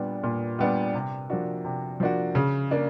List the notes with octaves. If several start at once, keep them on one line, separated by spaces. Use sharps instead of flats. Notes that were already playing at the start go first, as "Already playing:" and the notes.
Already playing: A#2 G3 B3 D4
A#2
G3 B3 D4
C3
F3 A#3 D4 F#4
C3
F3 A#3 D4 F#4
C#3
A#3 D4